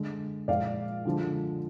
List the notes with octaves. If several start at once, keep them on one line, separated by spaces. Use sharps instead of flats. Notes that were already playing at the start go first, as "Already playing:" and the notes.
Already playing: D3 G#3
A#2 F3 G#3 D5 F5
D3 F3 G#3